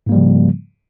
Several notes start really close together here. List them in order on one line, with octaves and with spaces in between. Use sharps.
G#2 A#3 G3 F3 C#3